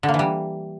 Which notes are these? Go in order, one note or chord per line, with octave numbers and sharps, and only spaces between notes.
D3
A#3
E3
G3